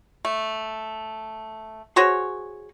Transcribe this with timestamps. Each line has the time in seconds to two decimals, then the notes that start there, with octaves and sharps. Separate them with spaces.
0.25 A3
1.96 F#4 G#4 C5 C#5